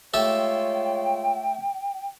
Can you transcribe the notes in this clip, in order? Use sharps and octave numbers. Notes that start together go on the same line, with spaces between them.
G#3 A3 F4 G4 A4 C#5 G5